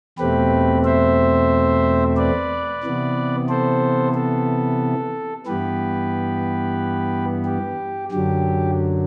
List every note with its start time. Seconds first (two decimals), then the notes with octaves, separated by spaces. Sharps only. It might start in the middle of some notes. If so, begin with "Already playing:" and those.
0.18 E2 B2 A3 C4 G4 B4
0.85 C5 E5
2.17 B4 D5
2.83 C3 E3 B3
3.49 A4 C5
4.14 A4
5.47 G2 E3 B3 G4 B4
7.45 G4
8.11 F#2 D3 F#3 G4